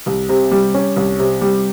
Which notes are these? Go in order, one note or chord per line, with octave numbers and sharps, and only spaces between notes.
C2
C3
G3
C#4
C2
C3
G3